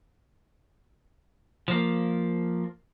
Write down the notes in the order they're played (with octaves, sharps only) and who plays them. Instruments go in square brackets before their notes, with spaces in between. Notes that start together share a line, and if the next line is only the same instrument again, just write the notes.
[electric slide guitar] F3 A#3